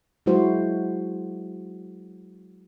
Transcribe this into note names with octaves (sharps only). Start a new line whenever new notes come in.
F#3 G#3 E4 F#4 C5